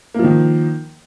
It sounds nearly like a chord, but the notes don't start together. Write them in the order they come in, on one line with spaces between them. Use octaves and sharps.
A#3 F3 D#3